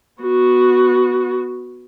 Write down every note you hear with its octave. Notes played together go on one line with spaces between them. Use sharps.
B3 F#4